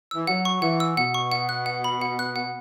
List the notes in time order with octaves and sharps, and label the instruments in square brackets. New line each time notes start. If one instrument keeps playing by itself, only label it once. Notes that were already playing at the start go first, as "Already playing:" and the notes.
[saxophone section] E3 [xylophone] E6
[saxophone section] F#3 [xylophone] F#5
[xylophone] C#6
[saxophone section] E3 [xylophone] F#5
[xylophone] E6
[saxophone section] B2 [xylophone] F#5
[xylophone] C#6
F#5
F#6
F#5
B5
F#5
F#6
F#5